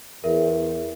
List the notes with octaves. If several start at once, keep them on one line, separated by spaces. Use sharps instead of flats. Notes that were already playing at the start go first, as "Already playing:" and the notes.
E2 A#4 E5